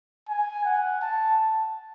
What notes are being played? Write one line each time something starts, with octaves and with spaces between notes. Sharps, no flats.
G#5
F#5
A5